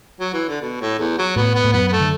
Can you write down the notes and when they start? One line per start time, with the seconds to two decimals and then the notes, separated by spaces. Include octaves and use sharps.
0.20 F#3
0.34 E3
0.48 D3
0.62 B2
0.81 A2
0.99 E2
1.18 F#3
1.36 A2 B3
1.55 B3
1.64 A2
1.73 F#2 B3
1.88 B3
1.92 A3
2.00 D3